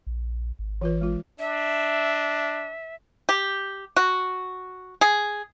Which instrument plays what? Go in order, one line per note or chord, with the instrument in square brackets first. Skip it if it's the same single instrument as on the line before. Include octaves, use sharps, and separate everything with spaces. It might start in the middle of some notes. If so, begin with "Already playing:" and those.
[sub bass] A#1
G#1
[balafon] E3 F4 B4
G#3 F4
[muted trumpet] D4 [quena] E5
[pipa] G4
F#4
G#4